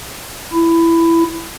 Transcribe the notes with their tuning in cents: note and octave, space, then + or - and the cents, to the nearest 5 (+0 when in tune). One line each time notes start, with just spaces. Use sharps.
E4 +15